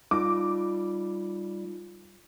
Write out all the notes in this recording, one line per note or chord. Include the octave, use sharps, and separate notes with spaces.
G3 D#4 F4 D6